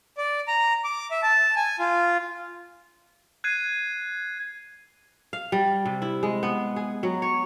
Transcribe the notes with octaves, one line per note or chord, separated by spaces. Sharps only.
D5
A#5
D6
E5
A5
G#5
F4
F#6 G#6 C7 D#7
F5
G3
C3
E4
G#3
B3
G#4
F#3
C#5